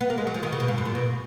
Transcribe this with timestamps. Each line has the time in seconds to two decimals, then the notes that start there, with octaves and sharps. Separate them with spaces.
0.01 B3
0.10 A#3
0.18 G#3
0.27 F#3
0.34 F3
0.43 D#3
0.52 C#3
0.60 B2
0.68 G#2
0.78 F#2
0.85 A#2
0.95 B2